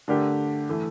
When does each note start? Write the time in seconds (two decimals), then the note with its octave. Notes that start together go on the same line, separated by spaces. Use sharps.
0.08 D3 A3 D4 G4 A#4
0.69 E3 A3